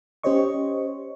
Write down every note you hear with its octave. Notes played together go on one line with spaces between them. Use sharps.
C#4 G4 C5 C#5 D#5 C#6